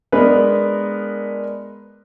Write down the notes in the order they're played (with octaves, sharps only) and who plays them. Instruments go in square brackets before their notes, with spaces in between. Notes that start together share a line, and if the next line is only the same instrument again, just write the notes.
[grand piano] G#3 B3 D4 A#4 B4